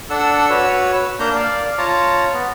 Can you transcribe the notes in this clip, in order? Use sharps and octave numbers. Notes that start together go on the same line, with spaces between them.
D4 A4 F#5 E6
F#4 B4 C#5 E6
A#3 D4 A#5 G6
D5 F5
F4 C#5 A5 A#5
B3